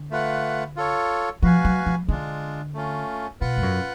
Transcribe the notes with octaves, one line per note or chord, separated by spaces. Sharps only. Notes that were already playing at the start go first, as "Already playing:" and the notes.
Already playing: D3
A3 F4 B4 F#5
F4 A4 C#5
F3 F#4 B4 F5 G#5
F#3
F3
D3 G#3 D4 F4
A3 C#4 F4
B2 F4 B4 F#5
G#2
F#2